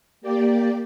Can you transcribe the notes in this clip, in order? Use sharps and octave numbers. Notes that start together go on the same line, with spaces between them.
A#3 G4 D5